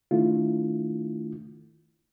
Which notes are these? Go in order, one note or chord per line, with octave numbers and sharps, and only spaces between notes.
D#3 A3 D4 E4 F4